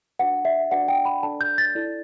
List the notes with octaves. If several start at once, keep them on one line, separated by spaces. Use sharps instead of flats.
D4 F#4 B4 F#5
E5
D4 F#4 B4 D5 F#5
G5
B5
D4 A4 D5 A5
G6
A6
E4 A4 D5